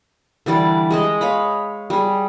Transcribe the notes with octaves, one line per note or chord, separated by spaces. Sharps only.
D3 E3 G3 D5
G#3 G#4 D#5
C#5 F5 B5
G3 G#4